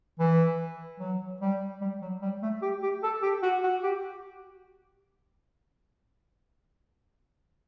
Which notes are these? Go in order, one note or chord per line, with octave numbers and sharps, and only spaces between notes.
E3
F#3
G3
G3
F#3
G3
A3
G4
G4
A4
G4
F#4
F#4
G4